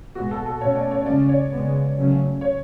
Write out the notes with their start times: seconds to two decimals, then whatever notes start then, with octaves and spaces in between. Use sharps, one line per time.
0.15 B2 G#3 B3 F#4
0.31 A4
0.46 A4
0.60 B2 A3 C#4 C#5
0.76 D5
0.91 C#5
1.05 C#3 G#3 C#4 D5
1.29 C#5
1.51 C#3 G#3 B3
1.96 C#3 F#3 A3 C#4
2.41 C#5